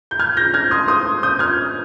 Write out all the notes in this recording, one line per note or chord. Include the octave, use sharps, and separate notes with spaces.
G6
F6 G#6
G6 A#6
F6 G#6
C6 D#6
C6 D#6
D#6 G6
F6 G#6